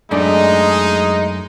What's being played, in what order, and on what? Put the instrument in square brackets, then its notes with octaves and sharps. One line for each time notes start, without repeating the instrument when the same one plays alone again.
[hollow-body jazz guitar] F#2 A3 D4 [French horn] G#3 [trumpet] D#4